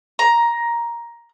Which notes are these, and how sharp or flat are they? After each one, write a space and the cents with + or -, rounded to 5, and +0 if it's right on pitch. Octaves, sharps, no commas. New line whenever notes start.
A#5 +10